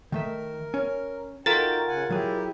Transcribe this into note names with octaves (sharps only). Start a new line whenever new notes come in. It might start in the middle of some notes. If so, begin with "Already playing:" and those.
D#3 A3 A#4 E5
C#4
D#4 F4 F#4 A4 A#4 G5 A6
C#3 F#5 G#5
F#3 E4 G4 G#4